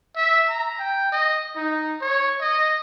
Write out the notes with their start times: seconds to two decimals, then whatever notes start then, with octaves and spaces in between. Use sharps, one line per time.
0.16 E5
0.49 A#5
0.79 G5
1.12 D#5
1.56 D#4
2.01 C#5
2.41 D#5